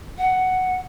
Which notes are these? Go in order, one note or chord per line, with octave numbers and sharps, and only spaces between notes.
F#5